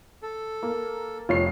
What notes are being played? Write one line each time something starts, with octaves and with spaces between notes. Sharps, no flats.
A4
A#3
F1 F4 C#5 C7